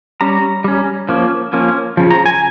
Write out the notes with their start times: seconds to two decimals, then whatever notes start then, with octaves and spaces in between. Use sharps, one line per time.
0.21 G3 C#4 A#5
0.64 G3 C#4
1.09 F3 A#3 C#4
1.53 F3 A#3 C#4
1.97 C#3 F3
2.11 A#5
2.26 G#5